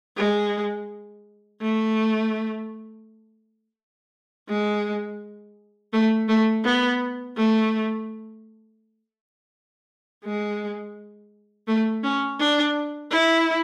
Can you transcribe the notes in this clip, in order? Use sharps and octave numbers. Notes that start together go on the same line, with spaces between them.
G#3
A3
G#3
A3
A3
B3
A3
G#3
A3
C#4
D4
E4